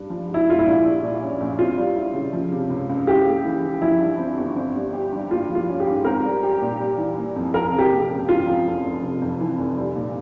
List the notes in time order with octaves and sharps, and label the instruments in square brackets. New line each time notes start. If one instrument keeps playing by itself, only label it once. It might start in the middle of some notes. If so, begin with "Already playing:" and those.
Already playing: [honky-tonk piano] G2
F3
G#2
[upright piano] E4
[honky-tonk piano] G#3 [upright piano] F4
[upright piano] E4
[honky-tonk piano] A#1
G3
A#2
C#4
A#1
[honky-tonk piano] C4 [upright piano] F4
[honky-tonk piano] G3
E4
C#3
F3
C3
C#2
C#2
[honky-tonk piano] E4 [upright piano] G4
[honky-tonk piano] A#3
E3
E3
[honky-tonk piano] F3 [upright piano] E4
[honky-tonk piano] G2
C4
G1
C4
G3
G4
G2
[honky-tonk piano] A#3 [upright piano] F4
[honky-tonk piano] F3
[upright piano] F4
[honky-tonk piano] C#4
[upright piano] G4
[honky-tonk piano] G#2
[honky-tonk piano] C4 [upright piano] A#4
[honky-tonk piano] G3
G4
A#2
G3
E3
A#3
F2
[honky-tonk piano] F3 [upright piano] A#4
[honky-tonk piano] C3
[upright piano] G4
[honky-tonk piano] A#3
C#2
[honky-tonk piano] E3 [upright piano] F4
[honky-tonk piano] F2
F1
F1
C3
F2
E3
F1
G3
A#2